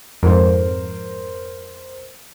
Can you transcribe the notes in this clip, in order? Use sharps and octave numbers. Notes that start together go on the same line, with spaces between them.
F2 G#2 A#4 C5